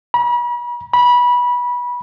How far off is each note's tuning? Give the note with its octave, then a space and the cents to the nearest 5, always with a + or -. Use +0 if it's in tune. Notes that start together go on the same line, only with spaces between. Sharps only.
B5 -40
B5 -20